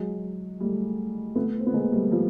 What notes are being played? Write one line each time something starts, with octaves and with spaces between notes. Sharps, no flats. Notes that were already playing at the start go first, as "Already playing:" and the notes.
Already playing: F#3 G#3
G3 A3
A3 B3
C4
B3
G#3 A#3
G3 A3
F3 G3